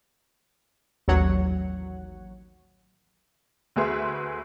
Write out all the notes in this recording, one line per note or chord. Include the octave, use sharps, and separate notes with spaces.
A1 D#2 F#3 C#5 F#5
D2 A3 G#4 B4 E5 C6